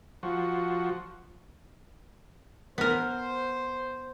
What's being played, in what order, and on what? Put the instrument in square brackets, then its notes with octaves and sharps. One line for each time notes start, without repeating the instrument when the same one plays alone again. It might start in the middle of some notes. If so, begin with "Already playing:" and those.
[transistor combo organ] F3 F#4
[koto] B3 A#4 [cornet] C5